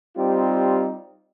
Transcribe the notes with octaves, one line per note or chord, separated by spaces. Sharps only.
G3 C4 D#4 F4 G4